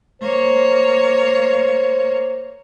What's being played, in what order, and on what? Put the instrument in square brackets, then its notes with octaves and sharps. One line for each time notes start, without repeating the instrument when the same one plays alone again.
[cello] A#3 C#5 [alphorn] C5